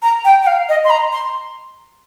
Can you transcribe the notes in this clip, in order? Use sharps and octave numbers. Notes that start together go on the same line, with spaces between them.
A#5
G5
G5
F5
D#5
C6
A#5
C6